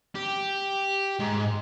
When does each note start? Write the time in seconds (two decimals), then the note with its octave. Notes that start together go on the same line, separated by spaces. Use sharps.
0.15 G4
1.19 G#2